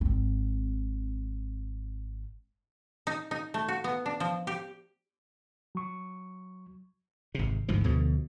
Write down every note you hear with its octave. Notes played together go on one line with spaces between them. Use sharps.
G#1 C4
D#4
D#4
A3
F#4
B3
D4
F3
G4
F#3 C#6
G#1 C3
G1 D2 G#2 F3
D2 B2 D3 F3